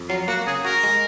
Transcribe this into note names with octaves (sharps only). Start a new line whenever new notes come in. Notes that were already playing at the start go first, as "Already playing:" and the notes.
Already playing: F2
F#3 F4
A#3 F#4
C#3 G#4
F#4 A#4
G#3